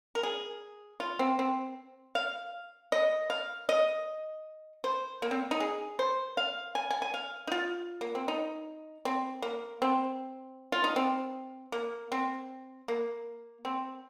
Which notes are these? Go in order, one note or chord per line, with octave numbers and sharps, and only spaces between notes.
A#4
G#4
F4
C4
C4
F5
D#5
F5
D#5
C5
A#3
C4
D#4
G#4
C5
F5
G#5
G#5
G#5
F5
D#4
F4
A#3
C4
D#4
C4
A#3
C4
F4
D#4
C4
A#3
C4
A#3
C4